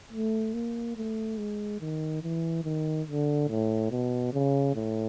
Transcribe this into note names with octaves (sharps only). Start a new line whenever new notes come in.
A3
A#3
A3
G#3
D#3
E3
D#3
D3
A2
B2
C#3
A2